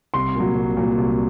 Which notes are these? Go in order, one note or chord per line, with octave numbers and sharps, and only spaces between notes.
C2 C6
A#2 F#3
C2
A#2 F#3
C2